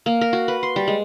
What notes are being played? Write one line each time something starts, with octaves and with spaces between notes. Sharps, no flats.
A#3
A#4
F#4
B4
C6
G3
G#3